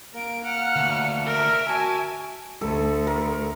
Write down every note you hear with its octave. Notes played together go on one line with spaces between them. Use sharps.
A#3 A#4 D7
F#5 F6 C#7
D2
A#4 E5 D7
F#4 G#5 A5
D2 A4
A#4